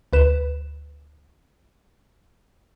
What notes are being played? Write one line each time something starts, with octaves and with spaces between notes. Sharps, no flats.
D2 B4 E7